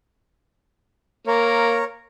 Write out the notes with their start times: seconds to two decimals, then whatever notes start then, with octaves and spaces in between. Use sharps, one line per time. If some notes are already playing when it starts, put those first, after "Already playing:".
1.27 A#3 A#4 C#5